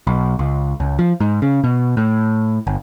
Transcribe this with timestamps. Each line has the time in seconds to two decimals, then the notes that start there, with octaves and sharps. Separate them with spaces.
0.07 B1
0.39 C#2
0.80 C#2
0.99 F3
1.20 G#2
1.42 C#3
1.64 B2
1.97 A2
2.67 G1